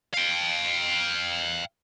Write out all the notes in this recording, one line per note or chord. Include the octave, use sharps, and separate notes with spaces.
F5 G5